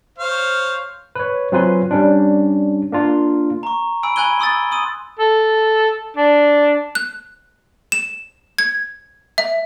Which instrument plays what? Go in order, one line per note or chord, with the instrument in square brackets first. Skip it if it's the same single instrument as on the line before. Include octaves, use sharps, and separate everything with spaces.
[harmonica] C5 C#5 F5
[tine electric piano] B4 C#5
F#3 C4 F4 B4 G#5 C6
G3 C#4 D4
A#3 D4 F4
[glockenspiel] A#5 C#6
G#5 B5 E6 D7
G#5 B5 F#6 G#6 D#7 G7
B5 C6 D#6 E6 F#6 A6
C6 D#6 D#7
[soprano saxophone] A4
D4
[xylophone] F#6
E7
G#6
E5